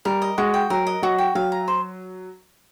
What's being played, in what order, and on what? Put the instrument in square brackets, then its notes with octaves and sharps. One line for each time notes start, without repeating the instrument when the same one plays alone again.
[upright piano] G3 [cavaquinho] A#4
[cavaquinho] D#5
[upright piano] G#3 [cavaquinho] F#4
[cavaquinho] G5
[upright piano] F#3 [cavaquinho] A#4
[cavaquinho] D#5
[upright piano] F#3 [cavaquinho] F#4
[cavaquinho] G5
[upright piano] F#3 [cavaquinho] F5
[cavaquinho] A#5
C5